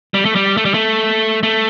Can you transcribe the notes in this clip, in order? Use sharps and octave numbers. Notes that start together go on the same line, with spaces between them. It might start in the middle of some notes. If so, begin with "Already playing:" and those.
G3
A3
G3
A3
G3
A3
A3